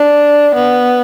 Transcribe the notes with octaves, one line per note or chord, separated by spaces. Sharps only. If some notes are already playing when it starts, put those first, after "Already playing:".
Already playing: D4
B3